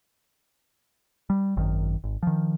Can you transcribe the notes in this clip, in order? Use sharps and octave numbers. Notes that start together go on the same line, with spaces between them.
G3
G#1 F#2 D#3
G#1
D#3 F3